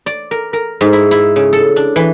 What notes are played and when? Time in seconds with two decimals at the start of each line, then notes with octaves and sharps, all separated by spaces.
0.06 D5
0.31 A#4
0.53 A#4
0.81 G#2
0.93 E4
1.11 E4
1.36 C#3
1.53 A4
1.76 D4
1.96 E3